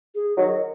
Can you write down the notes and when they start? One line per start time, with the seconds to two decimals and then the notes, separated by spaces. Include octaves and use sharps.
0.15 G#4
0.37 D#3 F#3 D#5